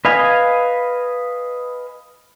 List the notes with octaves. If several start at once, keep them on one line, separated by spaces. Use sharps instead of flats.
B4 D#5 F5 G#5